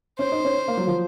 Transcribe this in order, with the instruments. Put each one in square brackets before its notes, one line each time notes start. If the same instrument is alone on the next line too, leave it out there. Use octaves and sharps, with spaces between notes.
[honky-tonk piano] C#4 [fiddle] C5
[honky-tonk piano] D#4
C#4
A#3
F#3
F3